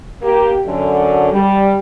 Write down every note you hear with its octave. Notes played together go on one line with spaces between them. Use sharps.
A#3 G4
F#2 D3
G3